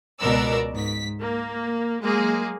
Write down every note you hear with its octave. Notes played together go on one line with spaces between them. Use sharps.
C#2 B2 A#4 D5 E6
G#2 B6
A#3
F#3 G#3 A#3 G#4